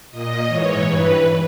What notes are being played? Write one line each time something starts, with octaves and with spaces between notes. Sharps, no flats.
A#2 D#5
G#2 E3 C#5
G2 E3 B4